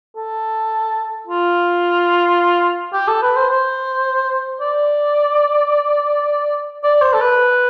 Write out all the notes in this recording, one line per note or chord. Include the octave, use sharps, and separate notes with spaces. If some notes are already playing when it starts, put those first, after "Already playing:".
A4
F4
G4
A4
B4
C5
C5
D5
D5
C5
A4
B4